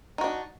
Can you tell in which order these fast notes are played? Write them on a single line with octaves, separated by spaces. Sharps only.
D#4 F#4 D4